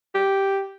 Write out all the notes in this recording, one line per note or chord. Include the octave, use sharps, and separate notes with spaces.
G4